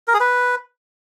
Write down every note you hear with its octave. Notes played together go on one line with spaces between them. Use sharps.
A#4
G#4
B4